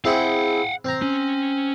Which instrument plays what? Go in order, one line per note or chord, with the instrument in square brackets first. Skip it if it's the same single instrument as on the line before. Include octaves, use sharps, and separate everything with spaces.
[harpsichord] C4 E4 G#4 [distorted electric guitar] F5 F#5
[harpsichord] C4 A#5
[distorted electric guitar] C#4